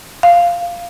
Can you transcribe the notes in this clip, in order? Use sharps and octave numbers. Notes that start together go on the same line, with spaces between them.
F5